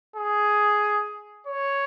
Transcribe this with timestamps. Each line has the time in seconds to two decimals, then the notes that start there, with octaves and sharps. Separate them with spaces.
0.16 G#4
1.47 C#5